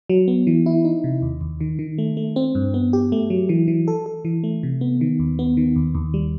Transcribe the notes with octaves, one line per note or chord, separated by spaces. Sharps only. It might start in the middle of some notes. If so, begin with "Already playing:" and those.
F#3
B3
E3
E4
D#4
C3
D#2
D#2
D#3
D#3
A3
A3
C4
G2
B3
G4
A3
F#3
E3
E3
A4
A4
E3
A3
C3
B3
D#3
D#2
B3
D#3
D#2
D#2
G3